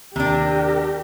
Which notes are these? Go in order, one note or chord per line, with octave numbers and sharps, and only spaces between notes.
D#2 C3 D4 G4 A#4